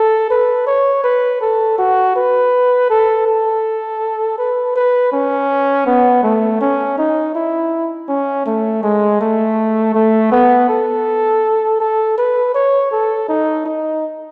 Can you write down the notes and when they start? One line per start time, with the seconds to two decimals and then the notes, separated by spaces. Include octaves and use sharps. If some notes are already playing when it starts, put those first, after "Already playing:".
Already playing: A4
0.30 B4
0.67 C#5
1.04 B4
1.41 A4
1.78 F#4
2.16 B4
2.90 A4
3.27 A4
4.38 B4
4.76 B4
5.12 C#4
5.86 B3
6.23 A3
6.61 C#4
6.98 D#4
7.35 E4
8.09 C#4
8.46 A3
8.83 G#3
9.21 A3
9.95 A3
10.32 B3
10.69 A4
11.80 A4
12.18 B4
12.55 C#5
12.92 A4
13.29 D#4
13.66 D#4